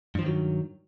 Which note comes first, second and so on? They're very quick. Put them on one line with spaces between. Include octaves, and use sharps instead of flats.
G2 F3 D#3 F#3